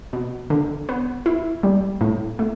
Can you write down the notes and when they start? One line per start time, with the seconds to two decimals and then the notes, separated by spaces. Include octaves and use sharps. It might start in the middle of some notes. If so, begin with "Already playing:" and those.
0.13 B2
0.50 D3
0.89 B3
1.26 E4
1.63 G3
2.01 A2
2.39 A3